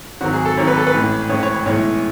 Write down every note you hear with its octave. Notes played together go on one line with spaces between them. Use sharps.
G#1 G#2 F#3 F#4
G#4
A4
G#1 G#2 F#3 C#5
B4
A4
B4
A1 A2 G#3
A1 A2 G#3 C#5
C#5
C#5
B1 A2 E3 G#3 C#5